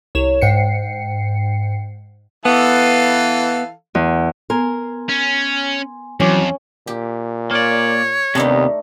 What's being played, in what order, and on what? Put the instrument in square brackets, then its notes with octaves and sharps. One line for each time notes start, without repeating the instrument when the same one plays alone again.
[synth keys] C2 C#5 E7
G#2 G5 C7 C#7
[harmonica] E3 A4 F5 [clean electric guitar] B3
[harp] E2
[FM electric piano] B3 G#5 C6 [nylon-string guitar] A#4
[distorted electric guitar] C#4
[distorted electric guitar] F2 [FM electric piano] E3 F#3 D6 [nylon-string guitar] C#4
[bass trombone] A#2 [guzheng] G4
[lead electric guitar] A#3 D5 [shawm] C#5
[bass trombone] D#2 [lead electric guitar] C3 B3 [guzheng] A3 D4 D#4